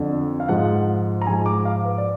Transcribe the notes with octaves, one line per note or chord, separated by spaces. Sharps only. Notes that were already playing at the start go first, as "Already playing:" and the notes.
Already playing: F2 D3 F3
F5
G#2 F3 G#3 F#5
A#5
G#2 F3 G#3 G#5
D6
F5
B4
D5